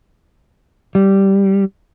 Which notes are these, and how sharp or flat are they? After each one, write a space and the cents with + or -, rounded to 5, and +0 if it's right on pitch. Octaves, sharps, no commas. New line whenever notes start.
G3 -5